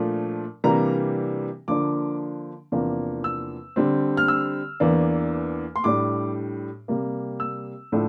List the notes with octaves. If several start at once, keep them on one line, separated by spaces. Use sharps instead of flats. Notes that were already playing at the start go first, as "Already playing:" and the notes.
Already playing: A#2 F3 A3 D4
C3 E3 G3 A#3 D4 A#5
D3 F3 A#3 D4 D6
E2 C3 F3 A#3 D4
E6
D3 G3 C4
F6
E6
E2 E3 A#3 D4
C6
A2 G3 D4 D6
C3 G3 A#3
E6
A2 F3 A3 D4